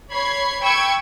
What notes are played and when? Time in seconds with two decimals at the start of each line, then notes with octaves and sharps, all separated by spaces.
0.11 C#5 B5 G#6 C7
0.62 G5 B5 C#6 E6 G#6 C#7